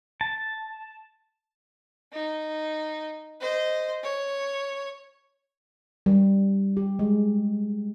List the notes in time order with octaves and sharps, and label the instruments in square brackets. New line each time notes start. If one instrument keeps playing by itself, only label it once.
[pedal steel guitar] A5
[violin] D#4
C5 D#5
C#5
[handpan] G3
G4
G#3